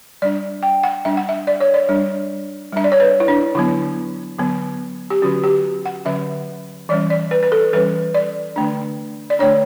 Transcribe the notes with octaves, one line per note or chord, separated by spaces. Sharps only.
G3 D4 D5
G5
F#5
G3 D4 E5
F#5
E5
D5
C#5
D5
G3 D4
G3 D4 E5
D5
C#5
B4
E4
D4
D3 F#3 B3 E4
D3 F#3 B3
G4
D3 F#3 C#4 F#4
G4
F#5
D3 F#3 C#4 E5
E3 G3 C#4 D5
D5
B4
B4
A4
E3 G3 C#4 B4
D5
D3 A3 D4
D5
D3 A3 D4 C#5